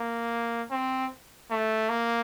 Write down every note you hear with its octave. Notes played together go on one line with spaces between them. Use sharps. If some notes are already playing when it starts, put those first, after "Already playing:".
Already playing: A#3
C4
A3
A#3